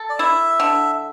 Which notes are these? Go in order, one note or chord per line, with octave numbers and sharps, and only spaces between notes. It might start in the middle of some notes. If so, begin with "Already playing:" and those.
Already playing: A4
D5
E4 E5
D3